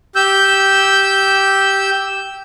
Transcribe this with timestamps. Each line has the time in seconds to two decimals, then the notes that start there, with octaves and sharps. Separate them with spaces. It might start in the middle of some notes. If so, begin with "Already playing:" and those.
0.15 G4 E6 G6